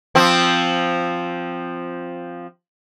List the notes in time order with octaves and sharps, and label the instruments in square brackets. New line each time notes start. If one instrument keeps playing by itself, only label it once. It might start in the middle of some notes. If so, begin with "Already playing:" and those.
[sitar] F3 C4